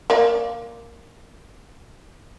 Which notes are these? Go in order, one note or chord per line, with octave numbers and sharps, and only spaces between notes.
A#3 D5